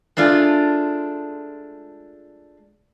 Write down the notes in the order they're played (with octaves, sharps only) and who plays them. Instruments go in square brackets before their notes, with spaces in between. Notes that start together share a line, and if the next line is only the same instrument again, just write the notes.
[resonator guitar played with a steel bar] G#3 A3 D4 F4